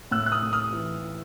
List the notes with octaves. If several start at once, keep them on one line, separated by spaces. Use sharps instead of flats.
A2 E6 F#6
F#6
D#6 F6
A2
D#6 F6
E3